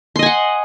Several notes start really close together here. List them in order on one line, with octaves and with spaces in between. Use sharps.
C6 D#5 G#5 F#5